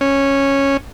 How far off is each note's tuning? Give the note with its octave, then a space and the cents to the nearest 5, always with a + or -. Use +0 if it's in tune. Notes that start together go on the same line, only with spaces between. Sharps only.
C#4 -10